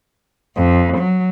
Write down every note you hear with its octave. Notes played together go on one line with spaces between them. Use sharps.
F2
F#3